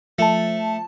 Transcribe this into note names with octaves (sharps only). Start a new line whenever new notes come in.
F3 A3 A5